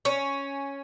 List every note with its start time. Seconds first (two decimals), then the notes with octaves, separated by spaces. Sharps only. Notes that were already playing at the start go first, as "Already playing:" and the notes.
0.05 C#4